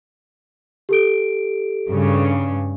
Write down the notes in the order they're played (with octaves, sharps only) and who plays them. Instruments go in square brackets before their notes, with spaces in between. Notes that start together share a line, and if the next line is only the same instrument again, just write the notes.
[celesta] G4 A4 D7
[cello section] G2 C#3